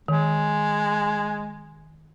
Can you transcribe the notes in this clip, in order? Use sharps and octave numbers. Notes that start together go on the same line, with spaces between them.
D#3 G#3